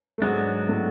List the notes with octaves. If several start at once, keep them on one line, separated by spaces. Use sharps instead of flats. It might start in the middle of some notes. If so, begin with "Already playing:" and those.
A3
G#2 F#3 G#3 B3 D4
A2 A3